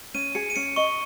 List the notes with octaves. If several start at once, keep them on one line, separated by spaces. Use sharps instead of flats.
C#4 D#7
G#4 C#7
D#7
C#4 C#7
D#5 C#6